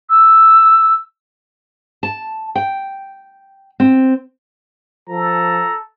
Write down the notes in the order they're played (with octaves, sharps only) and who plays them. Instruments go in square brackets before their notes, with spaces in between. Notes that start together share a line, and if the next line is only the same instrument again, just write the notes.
[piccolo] E6
[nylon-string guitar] A5
G5
C4
[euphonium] F3 [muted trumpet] A4 [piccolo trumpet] A#5